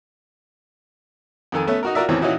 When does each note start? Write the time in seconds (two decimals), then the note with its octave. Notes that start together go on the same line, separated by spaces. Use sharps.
1.52 F2 D#3 A4 G#5
1.67 A3 B3 C#4 A4 E5
1.83 D#4 F#4 A#4
1.95 F4 F#4 A#4 D5 E5
2.09 E2 A2 D#3 E3 C4 C#4
2.21 A#2 E3 C#4 D#4 E4 F#4